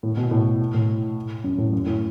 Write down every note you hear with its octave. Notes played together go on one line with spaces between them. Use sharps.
A2
B2
A2
A2
F#2
A2
F#2
A2